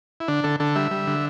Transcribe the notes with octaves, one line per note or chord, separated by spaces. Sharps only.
E4
D3 D4
D3 A4
D3 A4
G3 E5
G3
D3